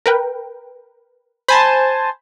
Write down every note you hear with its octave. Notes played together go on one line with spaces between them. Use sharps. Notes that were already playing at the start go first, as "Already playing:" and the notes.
A#4 B4 G5
C5 G#5 A5 B5